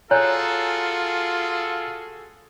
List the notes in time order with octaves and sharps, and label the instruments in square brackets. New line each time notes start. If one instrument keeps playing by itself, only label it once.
[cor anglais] F4 [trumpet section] F#4 G#4 A4 [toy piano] C#5 [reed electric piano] G#5 A#5 F#6